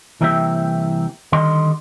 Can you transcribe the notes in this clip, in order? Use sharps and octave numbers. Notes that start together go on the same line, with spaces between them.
C2 E3 A#3 C4 G4 E5
D3 D#3 G3 D#5 C6